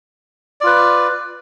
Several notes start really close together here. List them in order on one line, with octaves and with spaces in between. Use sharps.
D5 F4 B4